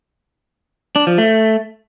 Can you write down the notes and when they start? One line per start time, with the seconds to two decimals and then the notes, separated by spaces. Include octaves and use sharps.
0.96 D4
1.07 F3
1.18 A3